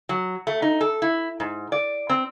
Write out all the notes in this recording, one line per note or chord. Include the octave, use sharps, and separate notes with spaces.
F#3
A3
D#4
A4
E4
G#2
D5
C4